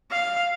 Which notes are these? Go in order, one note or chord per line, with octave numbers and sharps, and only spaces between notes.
F5